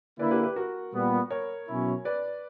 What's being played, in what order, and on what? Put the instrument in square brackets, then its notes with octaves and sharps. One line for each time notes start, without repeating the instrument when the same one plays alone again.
[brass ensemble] D3 A#3 E4 [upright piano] B4 D5
[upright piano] G4 B4
G4 B4
F#4 A#4
[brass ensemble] A#2 G3 B3
[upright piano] A#4 C#5
[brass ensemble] B2 F#3 C#4 E4
[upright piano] B4 D5